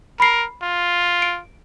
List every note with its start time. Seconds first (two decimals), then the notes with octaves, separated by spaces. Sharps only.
0.20 A#4 B5 C7
0.62 F4
1.22 D7